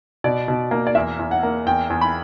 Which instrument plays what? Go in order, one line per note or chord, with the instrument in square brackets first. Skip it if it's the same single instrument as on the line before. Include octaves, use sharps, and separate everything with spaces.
[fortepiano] B2 D5
B2
A#3
D5
E2 E5
E2
F#5
A#3
E2 G5
E2
B5